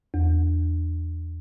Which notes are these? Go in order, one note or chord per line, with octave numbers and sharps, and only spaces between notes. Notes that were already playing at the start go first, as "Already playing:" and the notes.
E2